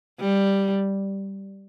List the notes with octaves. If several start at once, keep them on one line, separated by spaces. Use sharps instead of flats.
G3